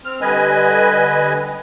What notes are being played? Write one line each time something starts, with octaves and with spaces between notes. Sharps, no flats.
C4 F6
D3 G3 B4 D#5 G#5